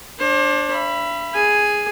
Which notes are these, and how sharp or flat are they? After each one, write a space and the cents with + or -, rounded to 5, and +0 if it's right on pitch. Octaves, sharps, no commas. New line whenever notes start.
D4 +0 C5 +40
E5 +40 B5 +0
G#4 +0 G#5 +0